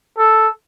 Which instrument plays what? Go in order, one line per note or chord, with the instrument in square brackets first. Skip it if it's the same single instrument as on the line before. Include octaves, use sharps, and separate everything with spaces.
[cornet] A4